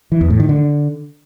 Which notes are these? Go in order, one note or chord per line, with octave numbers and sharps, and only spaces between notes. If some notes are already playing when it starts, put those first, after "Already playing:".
E3
E2
A2
D#3
D3